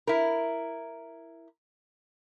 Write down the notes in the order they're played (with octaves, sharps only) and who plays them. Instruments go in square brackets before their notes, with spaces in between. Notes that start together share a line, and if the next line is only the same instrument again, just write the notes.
[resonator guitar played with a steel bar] E4 A#4